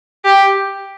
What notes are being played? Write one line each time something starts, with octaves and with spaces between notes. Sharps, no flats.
G4